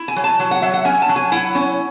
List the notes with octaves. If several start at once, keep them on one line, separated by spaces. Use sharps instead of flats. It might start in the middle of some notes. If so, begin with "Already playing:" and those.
Already playing: E4
G#5
F#3
A5
F#3
F#5
F#3 E5
F#5
C#4 G#5
A5
F#3
G#5
E4 F#5
C#4